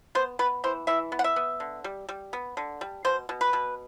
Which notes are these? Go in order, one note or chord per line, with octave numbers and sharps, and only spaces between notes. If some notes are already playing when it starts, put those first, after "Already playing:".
B3 C5
B3 B4
E3 C5
E3 E5
B3
F#5
E5
B3
D3
G3
G3
B3
D3
G3
B2 C5
B2
B4
B2